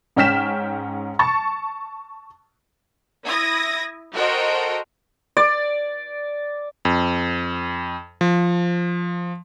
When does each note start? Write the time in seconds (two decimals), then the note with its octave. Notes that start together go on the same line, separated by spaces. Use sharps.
0.16 G#2 C#4 G5 F6 B6 E7
1.19 A5 C#6 A6
3.27 E4 D#6 G#6 A#6
4.15 F#4 A4 A#4 C5 D#5 G5
5.37 D5
6.85 F2
8.21 F3